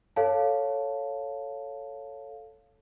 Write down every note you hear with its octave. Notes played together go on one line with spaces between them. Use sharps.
A4 C#5 F5 A5